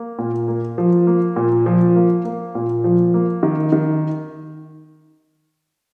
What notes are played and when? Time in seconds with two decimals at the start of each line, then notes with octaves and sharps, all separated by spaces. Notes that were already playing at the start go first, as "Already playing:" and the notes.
Already playing: A#3
0.19 A#2
0.48 A#3
0.78 F3
1.07 A#3
1.36 A#2
1.66 F3
1.96 A#3
2.25 A#3
2.55 A#2
2.84 F3
3.14 A#3
3.43 D#3
3.72 D#3